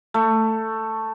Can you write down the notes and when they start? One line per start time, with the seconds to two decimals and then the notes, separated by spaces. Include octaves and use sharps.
0.14 A3